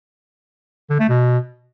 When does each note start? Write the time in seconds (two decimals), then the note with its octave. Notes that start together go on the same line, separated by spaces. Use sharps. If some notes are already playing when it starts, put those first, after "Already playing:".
0.90 D3
1.00 A3
1.09 B2